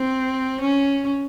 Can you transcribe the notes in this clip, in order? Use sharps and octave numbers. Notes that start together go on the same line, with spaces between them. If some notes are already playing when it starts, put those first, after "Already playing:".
Already playing: C4
C#4